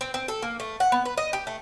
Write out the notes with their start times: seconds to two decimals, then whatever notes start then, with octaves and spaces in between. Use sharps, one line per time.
0.01 C4
0.14 C4
0.28 A4
0.42 A#3
0.60 A3
0.80 F#5
0.92 B3
1.05 B4
1.18 D#5
1.33 G4
1.47 A3